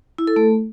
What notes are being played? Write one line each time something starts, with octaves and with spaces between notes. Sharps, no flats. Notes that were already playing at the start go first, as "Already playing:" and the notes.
E4
A4
A3